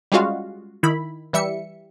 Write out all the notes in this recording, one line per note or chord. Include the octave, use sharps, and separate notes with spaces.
G3 G#3 C#4 F4 F#4 F5
D#3 E4 B5
E3 G3 E5 C#7